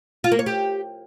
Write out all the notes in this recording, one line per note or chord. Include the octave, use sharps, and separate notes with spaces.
F4
A#3
C#5
G4